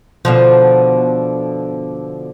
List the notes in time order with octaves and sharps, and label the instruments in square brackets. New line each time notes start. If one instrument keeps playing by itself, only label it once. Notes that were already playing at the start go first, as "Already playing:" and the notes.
[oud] B2 D3 F3